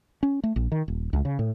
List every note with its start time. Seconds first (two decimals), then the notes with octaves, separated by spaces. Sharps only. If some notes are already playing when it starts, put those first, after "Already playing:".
0.23 C#4
0.44 A3
0.56 A#1
0.72 D#3
0.88 D#1
1.13 C#2
1.25 C#3
1.39 A2